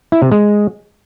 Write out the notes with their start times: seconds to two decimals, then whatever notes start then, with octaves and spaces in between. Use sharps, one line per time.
0.12 E4
0.22 C3
0.32 G#3